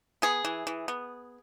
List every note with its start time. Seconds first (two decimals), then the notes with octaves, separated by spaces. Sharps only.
0.22 B3 G#4
0.45 E3
0.67 E3
0.88 B3